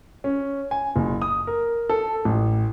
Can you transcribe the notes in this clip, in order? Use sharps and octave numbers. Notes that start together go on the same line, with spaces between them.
C#4
G#5
F#1
D#6
A#4
A4
A1